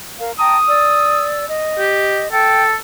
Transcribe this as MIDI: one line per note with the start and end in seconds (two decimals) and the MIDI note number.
0.19 0.31 70
0.19 0.31 77
0.39 0.57 79
0.39 0.57 81
0.39 0.57 82
0.39 1.30 87
0.68 1.48 74
0.68 1.48 88
1.49 2.32 75
1.78 2.21 67
2.32 2.74 69
2.32 2.64 79